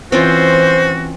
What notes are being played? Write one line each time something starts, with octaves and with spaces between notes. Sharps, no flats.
E3 C4 C#4 F4 F#4 C5